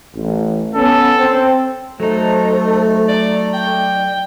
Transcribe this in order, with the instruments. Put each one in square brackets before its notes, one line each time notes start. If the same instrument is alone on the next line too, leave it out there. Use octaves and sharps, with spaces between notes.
[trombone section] A1
[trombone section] B3 C#4 [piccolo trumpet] A4
[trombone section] C4
[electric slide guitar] F#3 D#4 [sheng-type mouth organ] A3 [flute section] A4 C5
[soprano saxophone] D5
[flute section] D5 [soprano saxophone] G5